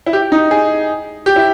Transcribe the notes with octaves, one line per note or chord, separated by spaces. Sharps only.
E4
G4
D#4
G#4
G4
E4